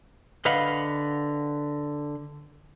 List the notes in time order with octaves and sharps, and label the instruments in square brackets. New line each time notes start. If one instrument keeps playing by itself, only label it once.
[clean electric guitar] D3 B4 D#5 F5 F#5 B5